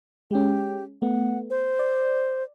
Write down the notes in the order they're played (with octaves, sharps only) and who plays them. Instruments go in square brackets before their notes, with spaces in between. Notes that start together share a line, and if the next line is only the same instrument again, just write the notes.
[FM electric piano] G#3 C#4 [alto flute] G4
[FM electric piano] A3 B3 [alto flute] F#5
[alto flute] C5
[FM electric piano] D5